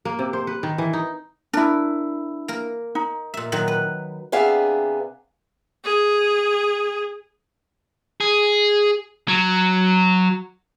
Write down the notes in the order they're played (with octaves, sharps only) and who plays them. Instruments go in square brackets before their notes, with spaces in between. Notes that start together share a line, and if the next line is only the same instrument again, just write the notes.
[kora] A#3
C3
C5
B4
D#3
E3
D#4
[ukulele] D4 E4 [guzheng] A#4
[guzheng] A#3 A#4
[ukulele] D#4
[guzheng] A#2 E5
A#2 D#3 F#3
B4
[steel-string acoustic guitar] C3 B3 D4 G#4 E5 F5
[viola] G#4
[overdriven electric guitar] G#4
F#3